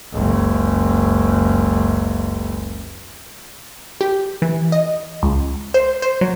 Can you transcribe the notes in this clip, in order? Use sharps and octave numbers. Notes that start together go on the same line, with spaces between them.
F#1 C#2
G4
E3
D#5
C#2
C5
C5
F#3